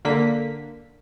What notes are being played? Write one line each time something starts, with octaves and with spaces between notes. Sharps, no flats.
D3 A#3 B6